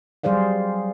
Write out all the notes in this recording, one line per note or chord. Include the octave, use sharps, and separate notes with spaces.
F#3 G3 G#4 C5 D5 F5